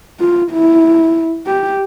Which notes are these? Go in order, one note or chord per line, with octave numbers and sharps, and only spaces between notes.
F4
E4
G4